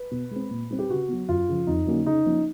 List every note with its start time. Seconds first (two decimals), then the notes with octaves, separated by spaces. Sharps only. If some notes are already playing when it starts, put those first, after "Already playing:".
Already playing: B4
0.11 B2
0.31 G#3 C4
0.51 A#2
0.71 G3 C4
0.79 G4
0.90 C#3 F#4
1.09 F#3 B3
1.29 F#2 F4
1.49 C#3 F3
1.67 F2 D#4
1.86 D3 F#3 A#3 C#4
2.06 C#3 D#4
2.26 F3 A#3 C#4